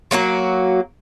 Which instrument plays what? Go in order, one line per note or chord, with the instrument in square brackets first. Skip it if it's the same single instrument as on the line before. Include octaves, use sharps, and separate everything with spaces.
[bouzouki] F#3 A#3 D#4 F#4